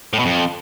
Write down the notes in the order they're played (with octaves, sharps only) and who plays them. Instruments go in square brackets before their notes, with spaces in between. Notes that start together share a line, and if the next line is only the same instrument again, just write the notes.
[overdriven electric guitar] A2
B2
F2